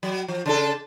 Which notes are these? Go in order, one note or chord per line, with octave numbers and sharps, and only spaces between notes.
F#3
F3
C#3 D4 A4